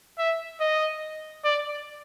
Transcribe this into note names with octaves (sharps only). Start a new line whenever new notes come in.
E5
D#5
D5